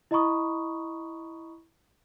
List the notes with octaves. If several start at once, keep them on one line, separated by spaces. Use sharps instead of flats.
E4 D#5 A#5 B5 C#6 D#6